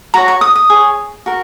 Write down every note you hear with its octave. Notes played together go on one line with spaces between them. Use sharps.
F#4 C#5 A#5
C#6
D#6
D#6
G#4 C#5
F#4 A#4